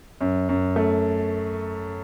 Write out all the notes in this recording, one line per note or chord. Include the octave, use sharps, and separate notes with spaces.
F#2
F#2
A3